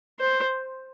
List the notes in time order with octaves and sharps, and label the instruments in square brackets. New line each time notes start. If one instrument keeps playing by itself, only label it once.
[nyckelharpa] C5